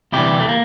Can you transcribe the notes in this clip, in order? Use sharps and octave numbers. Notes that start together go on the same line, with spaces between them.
D2 C3 E3 G3 E4 G4
A3
A#3